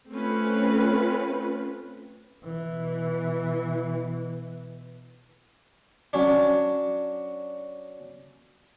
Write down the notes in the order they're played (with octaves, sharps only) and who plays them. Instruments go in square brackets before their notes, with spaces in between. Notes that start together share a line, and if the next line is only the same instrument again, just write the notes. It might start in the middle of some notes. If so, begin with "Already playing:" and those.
[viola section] A3 C4 C#4 F4 B4
[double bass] B2 E3
[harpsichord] F#3 C#4 D4